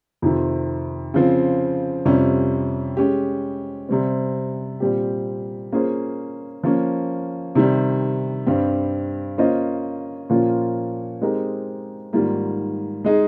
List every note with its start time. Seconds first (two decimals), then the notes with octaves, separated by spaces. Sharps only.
0.22 F2 C3 D#3
1.14 C#3 F3 C4
2.05 F2 C3 G3 C#4
2.97 G#3 C#4 G4
3.89 C3 G3 C4
4.80 A#2 G3 C4 G4
5.72 A#3 C#4 F4 G#4 C5
6.64 F3 A#3 C#4
7.55 C3 D#3 G3
8.46 G2 G3 C4 G4
9.38 A#3 C#4 F4 C5 D#5
10.30 A#2 F3 A#3 C#4 F4
11.22 G#3 C4 D#4 G4 A#4
12.13 G#2 D#3 G3 A#3 F4
13.05 G#3 D#4 G#4